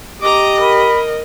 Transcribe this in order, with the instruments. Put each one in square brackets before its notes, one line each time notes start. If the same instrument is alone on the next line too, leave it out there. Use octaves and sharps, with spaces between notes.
[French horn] G4 [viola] D#5 [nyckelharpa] A#5 D6
[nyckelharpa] A#4 [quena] B5